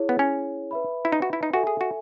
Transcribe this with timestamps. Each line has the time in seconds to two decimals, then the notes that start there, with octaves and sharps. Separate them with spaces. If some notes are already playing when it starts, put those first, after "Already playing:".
Already playing: E4 G#4 C#5
0.09 B3
0.19 C#4
0.71 B4 E5 B5
1.05 E4
1.12 D#4
1.22 F#4
1.33 E4
1.43 D#4
1.53 F#4 A4 E5 G#5
1.67 G#4
1.81 F#4